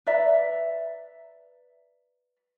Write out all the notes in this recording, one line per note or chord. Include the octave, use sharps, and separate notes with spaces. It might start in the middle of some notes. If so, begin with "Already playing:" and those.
B4 D5 E5 A#5